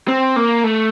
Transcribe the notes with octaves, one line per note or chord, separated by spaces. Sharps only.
C4
A#3
A3